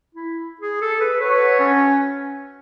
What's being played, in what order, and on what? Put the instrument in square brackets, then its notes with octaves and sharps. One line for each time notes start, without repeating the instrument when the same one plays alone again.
[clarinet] E4
G#4
A4
B4
[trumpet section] F#4 A4 C#5 [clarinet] B4
[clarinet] C#4